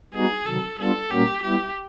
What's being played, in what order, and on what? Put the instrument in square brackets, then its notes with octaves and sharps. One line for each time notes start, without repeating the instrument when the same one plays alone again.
[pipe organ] G3 B3 D#4 F#4 [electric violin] G#4
[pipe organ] C3 D#3 F#3 [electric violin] A4
[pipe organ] G3 B3 D4 F4 [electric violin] A4
[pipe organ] A#2 G3 A#3 C#4 F#4 [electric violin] G4
[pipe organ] G3 B3 E4 [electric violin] G4